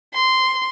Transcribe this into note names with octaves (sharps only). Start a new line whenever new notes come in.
C6